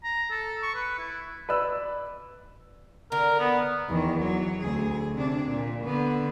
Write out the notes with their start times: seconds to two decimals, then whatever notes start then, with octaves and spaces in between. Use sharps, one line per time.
0.04 A#5
0.31 A4
0.62 C#6
0.75 B4
0.99 E4
1.49 B4 D5 E6
3.12 D3 A#4
3.40 B3
3.89 E2 D#3
4.20 F#3
4.61 D2 G#4
5.14 C3 D4
5.47 A#2
5.84 D3 B3